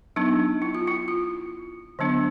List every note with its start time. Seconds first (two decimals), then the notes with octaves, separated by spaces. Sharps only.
0.16 F#3 B3 D4 D#4
0.62 E4
0.75 F4
0.87 E4
1.08 F4
1.99 D3 F#3 B3 D4